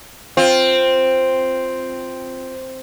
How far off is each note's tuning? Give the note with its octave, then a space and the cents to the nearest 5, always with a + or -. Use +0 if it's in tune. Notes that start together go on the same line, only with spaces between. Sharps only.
C4 +0 F4 +5